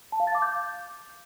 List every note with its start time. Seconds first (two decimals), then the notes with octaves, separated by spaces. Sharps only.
0.12 A5
0.20 F5
0.27 A6
0.35 D6
0.42 G6